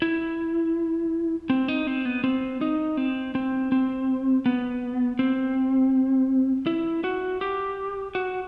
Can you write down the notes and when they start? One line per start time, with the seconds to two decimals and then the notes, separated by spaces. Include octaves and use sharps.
0.02 E4
1.50 C4
1.68 D#4
1.87 C4
2.05 B3
2.24 C4
2.61 D#4
2.97 C4
3.35 C4
3.72 C4
4.46 B3
5.19 C4
6.67 E4
7.04 F#4
7.41 G4
8.15 F#4